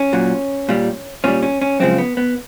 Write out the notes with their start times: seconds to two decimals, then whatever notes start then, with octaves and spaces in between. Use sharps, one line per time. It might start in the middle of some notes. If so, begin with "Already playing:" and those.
Already playing: C#4
0.13 A#2 F#3
0.69 A#2 G3
1.24 A#2 G3 C#4
1.43 C#4
1.62 C#4
1.80 F#2 C#3 F3 G#3 C4
1.98 B3
2.17 B3